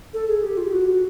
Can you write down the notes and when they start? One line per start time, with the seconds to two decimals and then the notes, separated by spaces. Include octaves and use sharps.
0.13 A4
0.28 G#4
0.43 G4
0.57 F4
0.66 G4
0.72 F#4